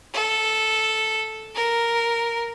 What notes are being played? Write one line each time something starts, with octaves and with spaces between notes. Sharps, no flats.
A4
A#4